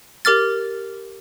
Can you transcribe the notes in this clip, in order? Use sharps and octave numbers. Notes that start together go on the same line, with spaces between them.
G4 A#4 D6 F6 A6